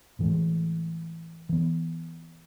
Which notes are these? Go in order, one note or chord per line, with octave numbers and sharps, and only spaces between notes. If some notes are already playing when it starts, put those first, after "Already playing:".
A2 E3 G#3
E3 B3